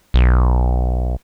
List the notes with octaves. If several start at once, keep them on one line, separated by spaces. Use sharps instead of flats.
B1